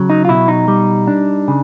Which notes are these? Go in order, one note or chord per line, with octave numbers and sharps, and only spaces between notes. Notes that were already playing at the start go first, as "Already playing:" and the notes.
Already playing: C#3 F#3
D#4
F4
B2 E4
D#4
G3
D4
C#3